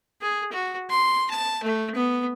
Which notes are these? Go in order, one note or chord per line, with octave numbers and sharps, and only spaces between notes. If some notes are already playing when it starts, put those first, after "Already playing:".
G#4
F#4
C6
A5
A3
B3